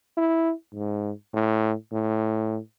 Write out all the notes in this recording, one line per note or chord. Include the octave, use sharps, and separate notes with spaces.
E4
G#2
A2
A2